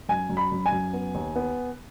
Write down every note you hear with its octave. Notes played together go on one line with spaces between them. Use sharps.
F#2 G#5
F#2
B5
F#2
G#5
F#2
B3
D#2
B3